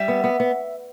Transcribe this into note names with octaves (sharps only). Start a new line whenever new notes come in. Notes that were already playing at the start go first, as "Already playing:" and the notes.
Already playing: G3 E5
B3
B3
B3